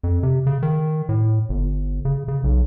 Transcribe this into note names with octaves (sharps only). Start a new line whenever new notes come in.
F2
C3
C#3
D#3
A2
G1
C#3
C#3
B1